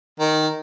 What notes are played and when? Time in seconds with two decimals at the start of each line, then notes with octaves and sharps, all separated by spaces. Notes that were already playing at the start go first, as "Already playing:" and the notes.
0.19 D#3